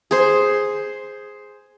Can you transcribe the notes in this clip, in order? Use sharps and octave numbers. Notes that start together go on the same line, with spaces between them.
G#4 C5